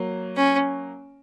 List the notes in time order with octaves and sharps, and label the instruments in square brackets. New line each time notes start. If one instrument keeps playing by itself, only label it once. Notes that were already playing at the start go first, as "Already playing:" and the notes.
Already playing: [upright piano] F#3 A#3
[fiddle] C#4